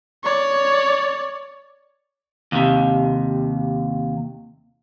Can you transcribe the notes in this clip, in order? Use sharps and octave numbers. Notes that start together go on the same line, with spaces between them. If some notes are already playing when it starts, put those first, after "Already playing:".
C#5 D5
D#2 C3